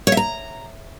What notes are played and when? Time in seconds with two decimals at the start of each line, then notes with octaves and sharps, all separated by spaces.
0.07 C#5
0.12 E5
0.17 A#5